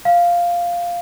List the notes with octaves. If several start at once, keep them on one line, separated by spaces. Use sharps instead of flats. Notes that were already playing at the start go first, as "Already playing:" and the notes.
F5